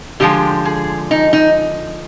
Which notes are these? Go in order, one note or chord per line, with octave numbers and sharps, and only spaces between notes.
D3 F3 G#3 G4
G#4
D#4
D#4